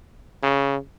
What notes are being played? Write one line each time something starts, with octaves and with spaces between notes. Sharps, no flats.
C#3